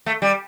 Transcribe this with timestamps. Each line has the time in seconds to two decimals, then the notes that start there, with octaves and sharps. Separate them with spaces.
0.06 A3
0.22 G3